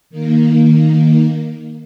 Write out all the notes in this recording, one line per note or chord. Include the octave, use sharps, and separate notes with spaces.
D#3 A#3